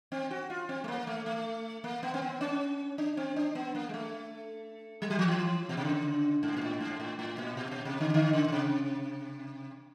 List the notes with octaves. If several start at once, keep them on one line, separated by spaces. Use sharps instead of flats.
C4
F#4
F4
C4
A3
A#3
A3
A3
A#3
B3
C4
B3
C#4
D4
C4
D4
B3
A#3
G#3
A3
G3
F#3
F3
E3
B2
C3
C#3
G#2
A#2
A2
G#2
A2
A2
A#2
B2
B2
C3
D3
D3
C#3
C#3
C3